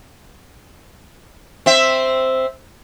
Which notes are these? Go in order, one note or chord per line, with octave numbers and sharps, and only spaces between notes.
C4 E5